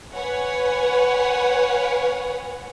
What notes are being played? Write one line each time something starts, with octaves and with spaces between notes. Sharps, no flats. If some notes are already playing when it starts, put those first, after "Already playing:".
B4 C#5 F#5 G#5